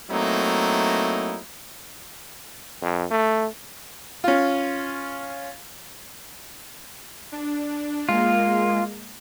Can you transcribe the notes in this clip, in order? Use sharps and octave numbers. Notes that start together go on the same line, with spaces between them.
F#3 A3 A#3 C4 D#4 E4
F2
A3
C#4 F4
D4
G#3 A#3 F4